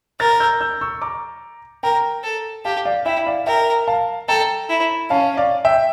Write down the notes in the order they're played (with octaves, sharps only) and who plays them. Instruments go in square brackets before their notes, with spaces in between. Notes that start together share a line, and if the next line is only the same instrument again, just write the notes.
[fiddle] A#4 [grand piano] F6 A6
[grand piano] E6 G6
E6 G6
C#6 E6
A#5 D6
[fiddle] A#4 [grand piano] G5 A#5
[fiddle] A4
[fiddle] G4 [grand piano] F5 A5
[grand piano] D5 F5
[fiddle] E4 [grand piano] E5 G5
[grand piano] D5 F5
[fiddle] A#4 [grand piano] E5 G5
[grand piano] F5 A5
[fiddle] A4 [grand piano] G5 A#5
[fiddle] E4
[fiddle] C#4 [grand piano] F5 A5
[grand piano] D5 F5
E5 G5